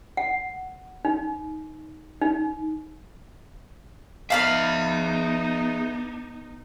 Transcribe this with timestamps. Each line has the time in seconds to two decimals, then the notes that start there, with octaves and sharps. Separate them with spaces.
0.17 F#5
1.05 D#4
2.22 D#4
4.30 B3 D#4 G#4 E5 F5 B5 F6